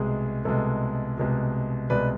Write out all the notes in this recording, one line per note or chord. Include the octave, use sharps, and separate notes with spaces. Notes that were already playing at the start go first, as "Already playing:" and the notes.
Already playing: C2 B2 G#3 G#4
C2 B2 G#3 A4
C2 B2 G#3
C2 B2 G#3 B4 D5